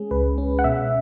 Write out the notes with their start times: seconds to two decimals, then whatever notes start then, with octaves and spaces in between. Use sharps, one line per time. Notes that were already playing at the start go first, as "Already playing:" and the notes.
Already playing: G#3 C#4 G#4
0.11 C#2 B4
0.38 C#4
0.59 F#5
0.64 B2 E5